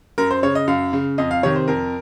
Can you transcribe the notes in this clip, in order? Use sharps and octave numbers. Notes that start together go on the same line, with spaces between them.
F#2 A#4
C5
C#3 C#5
D#5
F#2 F5
C#3
F2 D#5
F5
C3 D#3 C#5
C5
F2 A#4